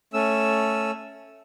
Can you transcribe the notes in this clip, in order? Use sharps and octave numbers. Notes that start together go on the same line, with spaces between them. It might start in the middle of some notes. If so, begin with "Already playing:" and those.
A3 C#4 E6